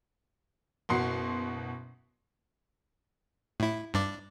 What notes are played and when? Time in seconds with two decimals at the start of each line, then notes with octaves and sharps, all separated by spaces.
0.89 F#1 B2 F#4 C6 C7 C#7
3.60 A2 E4
3.94 G2 D4 D5